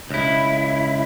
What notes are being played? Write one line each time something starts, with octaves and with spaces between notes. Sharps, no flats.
C#2 E4